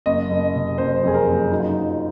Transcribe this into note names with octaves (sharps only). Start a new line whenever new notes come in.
F#1 D#5
F#1
C3
F#1 C5
F2 G#4
A#4
F#1
F#3 D#4
F4
D#4
F#3